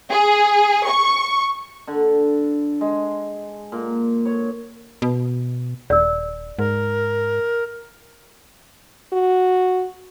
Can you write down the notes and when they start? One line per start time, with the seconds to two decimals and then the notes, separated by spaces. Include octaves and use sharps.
0.12 G#4
0.88 C#6
1.87 D3
2.81 G#3
3.72 A#2
4.25 C#5
5.02 B2
5.90 D#1 D5 E6
6.59 G#2 A#4
9.13 F#4